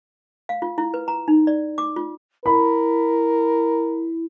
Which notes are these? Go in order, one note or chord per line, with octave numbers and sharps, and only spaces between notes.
F5
F4
E4
B4
A#5
D#4
D5
D6
F4
E4 A#4 B5